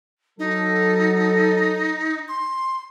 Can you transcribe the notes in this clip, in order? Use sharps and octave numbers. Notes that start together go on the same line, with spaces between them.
F#3 D#4 A4
C6